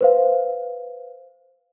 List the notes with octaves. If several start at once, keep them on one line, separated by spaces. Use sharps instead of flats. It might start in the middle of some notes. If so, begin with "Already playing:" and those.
B4 C5 F5